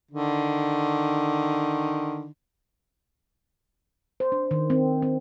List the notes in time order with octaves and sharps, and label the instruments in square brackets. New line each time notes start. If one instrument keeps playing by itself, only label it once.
[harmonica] D3 D#3
[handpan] C5
D4
D#3
C4
C4